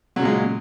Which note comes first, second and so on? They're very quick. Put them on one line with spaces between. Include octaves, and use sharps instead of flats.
F#3 C#3 A#2 G#3